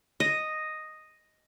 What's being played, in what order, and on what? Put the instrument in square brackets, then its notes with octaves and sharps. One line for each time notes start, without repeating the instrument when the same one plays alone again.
[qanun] D#5